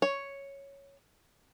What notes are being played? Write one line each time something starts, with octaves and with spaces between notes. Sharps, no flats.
C#5